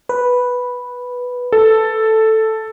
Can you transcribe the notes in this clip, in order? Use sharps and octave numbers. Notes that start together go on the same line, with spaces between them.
B4
A4